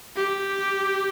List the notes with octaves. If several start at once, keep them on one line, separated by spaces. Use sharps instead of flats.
G4